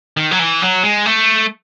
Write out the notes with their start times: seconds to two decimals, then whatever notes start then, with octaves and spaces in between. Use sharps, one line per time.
0.17 D#3
0.31 F#3
0.39 E3
0.62 F#3
0.83 G#3
1.06 A3